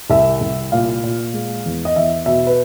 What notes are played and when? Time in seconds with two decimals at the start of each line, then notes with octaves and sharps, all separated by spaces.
0.10 C2 E5
0.41 C2
0.72 A#2 F5
1.03 A#2
1.34 G#3
1.65 E2
1.85 D#5
1.96 E2 E5
2.26 B2 E5
2.47 B4